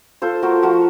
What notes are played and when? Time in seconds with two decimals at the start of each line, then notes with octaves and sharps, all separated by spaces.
0.22 F4 A4 C5
0.43 A3 F#4 A#4
0.62 F3 F#4 A#4